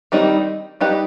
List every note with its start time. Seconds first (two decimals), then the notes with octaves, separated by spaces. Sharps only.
0.12 D#3 G3 C4 D#4
0.81 G3 D#4 G4 B4 D#5